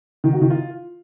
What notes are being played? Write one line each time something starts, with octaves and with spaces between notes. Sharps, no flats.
D#3
F#4
D#3
F4